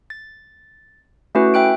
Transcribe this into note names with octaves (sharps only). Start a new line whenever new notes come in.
A6
A3 C#4 E4 F#4 B4
E5 G5 F#6 D7